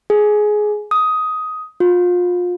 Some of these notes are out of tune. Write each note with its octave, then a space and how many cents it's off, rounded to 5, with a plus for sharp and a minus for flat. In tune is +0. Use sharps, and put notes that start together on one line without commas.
G#4 +15
D#6 +10
F4 +30